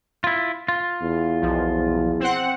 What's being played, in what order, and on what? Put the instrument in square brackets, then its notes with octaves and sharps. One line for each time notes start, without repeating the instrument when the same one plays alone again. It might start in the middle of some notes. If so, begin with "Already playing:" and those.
[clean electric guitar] E4 F4
F4
[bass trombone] E2
[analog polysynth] B1 F3
C4 C5 F#5